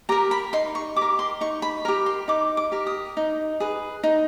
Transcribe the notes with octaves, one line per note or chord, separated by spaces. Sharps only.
G4 A#4 A#5
B5
D#4 C6
C#6
G4 A#4 D6
C6
D#4 C#6
B5
G4 A#4 A#5
C6
D#4 D6
D6
G4 A#4
D#6
D#4
G#4 B4
D#4